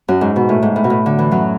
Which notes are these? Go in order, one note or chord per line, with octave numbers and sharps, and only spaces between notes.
F#2
G#2
B2
A2
G#2
A2
B2
A2
D3
E3
F#2 F#3